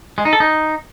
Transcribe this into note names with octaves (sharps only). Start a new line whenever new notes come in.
G#3
D#4
A4
D#4